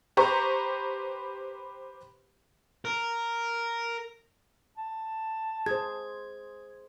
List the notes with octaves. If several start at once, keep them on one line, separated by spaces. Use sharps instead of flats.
G4 B4 C5 A#5 C#6
A#4
A5
G#4 C5 G#6